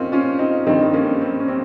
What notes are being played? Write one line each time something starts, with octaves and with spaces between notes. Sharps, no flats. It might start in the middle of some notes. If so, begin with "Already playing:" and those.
Already playing: A#3 C4 C#4 D#4 F4
C#4 F4
C4 D#4
G2 D#3 C4 D#4
A#3 C#4
C4
C#4
C4